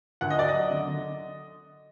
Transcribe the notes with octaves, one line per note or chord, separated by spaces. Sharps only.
D2 F#5
D#5
F#3 D5
D#5
F#3
D3
D3